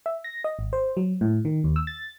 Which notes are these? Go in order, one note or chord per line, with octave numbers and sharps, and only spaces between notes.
E5
A#6
D#5
G#1
C5
F#3
A2
D#3
D#2
E6
A6